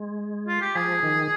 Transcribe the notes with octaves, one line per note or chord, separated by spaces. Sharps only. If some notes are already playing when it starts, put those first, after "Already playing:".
Already playing: G#3
F4
G4
F3 G#4
D#3